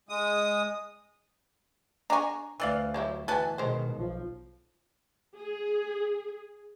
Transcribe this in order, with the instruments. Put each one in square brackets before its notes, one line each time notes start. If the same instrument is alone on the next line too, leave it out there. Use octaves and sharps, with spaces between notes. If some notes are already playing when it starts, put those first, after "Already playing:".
[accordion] G#3 D#6
[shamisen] D4 G#5 [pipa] A#5 C#6
[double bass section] D2 [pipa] E3 D5 F5
[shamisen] F#3 G3 E4
[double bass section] E3 [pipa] B3 F#4 A5 [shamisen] B4 G#5
[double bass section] B2 D#3 [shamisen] G#3 C5
[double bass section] B1 F3
[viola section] G#4